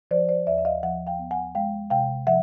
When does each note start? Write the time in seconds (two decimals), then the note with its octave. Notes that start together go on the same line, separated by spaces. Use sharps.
0.11 F3 C5 D5
0.29 C5 D5
0.47 D#2 D5 E5
0.58 E5
0.65 D#5 F5
0.83 F3 E5 F#5
1.07 F5 G5
1.19 B3
1.31 F#5 G#5
1.55 G#3 F5 G5
1.90 C3 F5 G5
2.27 F3 E5 F#5